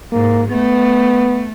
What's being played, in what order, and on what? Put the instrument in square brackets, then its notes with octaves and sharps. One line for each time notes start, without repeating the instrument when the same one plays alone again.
[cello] G#2 [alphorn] A#3
[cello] A3 [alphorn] B3